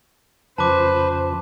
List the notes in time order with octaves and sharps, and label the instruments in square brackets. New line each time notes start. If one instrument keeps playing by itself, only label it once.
[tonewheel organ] F2 C#3 F3 [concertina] B4 [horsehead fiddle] C5 [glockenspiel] A5 D6